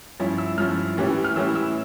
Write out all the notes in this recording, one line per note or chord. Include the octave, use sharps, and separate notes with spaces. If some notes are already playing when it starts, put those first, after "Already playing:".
G2 F3 C#4 E4
E6
G2 F3 C#4 E4 F6
A2 E3 G3 C#4 E4
F6
A2 E3 G3 C#4 E4 E6
E6